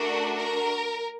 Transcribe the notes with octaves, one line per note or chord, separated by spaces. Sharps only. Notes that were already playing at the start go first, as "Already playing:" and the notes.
Already playing: A3 D4 F#4 A#4
A#4